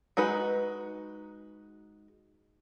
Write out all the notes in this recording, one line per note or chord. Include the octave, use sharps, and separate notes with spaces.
G#3 D#4 F#4 B4